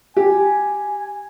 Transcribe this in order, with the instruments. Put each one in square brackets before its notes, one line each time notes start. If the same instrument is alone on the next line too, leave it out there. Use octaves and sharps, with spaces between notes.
[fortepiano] G4 [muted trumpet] G#5